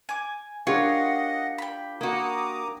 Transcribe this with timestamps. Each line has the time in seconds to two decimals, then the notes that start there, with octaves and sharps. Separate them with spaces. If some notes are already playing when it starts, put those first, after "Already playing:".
0.09 G#5 D6
0.67 D4 F4 G4 A#4 C#5 D#5 F#5
1.58 G5 B5
2.01 A#3 F#4 A#5 D6 D#6